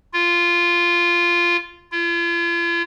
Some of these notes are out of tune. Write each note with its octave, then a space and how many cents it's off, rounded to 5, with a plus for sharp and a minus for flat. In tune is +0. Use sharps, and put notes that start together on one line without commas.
F4 -10
F4 -40